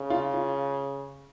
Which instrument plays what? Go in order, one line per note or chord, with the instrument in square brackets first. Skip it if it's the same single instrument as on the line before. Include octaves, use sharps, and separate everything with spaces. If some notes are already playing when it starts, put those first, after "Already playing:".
Already playing: [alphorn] C#3
[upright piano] F4
F4